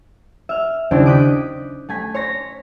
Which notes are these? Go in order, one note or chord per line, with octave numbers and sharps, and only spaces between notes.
E5 F6
D#2 C#3 C4 D4 E4
D6 D#6 F#6 G6 B6
A3 G#5 B6
C#5 C6 A#6 B6